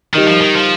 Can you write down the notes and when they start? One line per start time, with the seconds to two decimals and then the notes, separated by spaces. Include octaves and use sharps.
0.13 D#3 G3 D#4 A#4
0.28 F3
0.41 D#3
0.56 F3